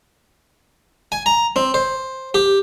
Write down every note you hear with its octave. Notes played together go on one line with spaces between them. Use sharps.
G#5
A#5
C4
C5
G4